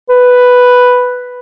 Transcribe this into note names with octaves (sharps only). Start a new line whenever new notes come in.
B4